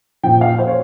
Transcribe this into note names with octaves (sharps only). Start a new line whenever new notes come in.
A#2 F3 G5
F5
C5
C#5